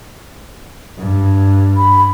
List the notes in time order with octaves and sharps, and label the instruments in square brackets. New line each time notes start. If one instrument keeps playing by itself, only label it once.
[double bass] G2
[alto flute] B5